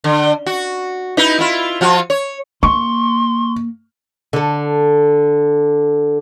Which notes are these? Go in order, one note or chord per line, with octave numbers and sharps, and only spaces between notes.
D3
F#4
D#4 E4 B4
E4 F4
F3 F4 F#4
C#5
A#3 C6 C#6
D3 A4